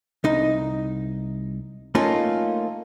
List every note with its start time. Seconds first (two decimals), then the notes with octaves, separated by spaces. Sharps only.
0.24 C2 D#4
1.95 A3 A#3 C#4 D#4 F4 A4